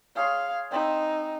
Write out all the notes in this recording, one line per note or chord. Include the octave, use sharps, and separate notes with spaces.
G#4 C#5 F5 C6
C4 D#4 B5 E6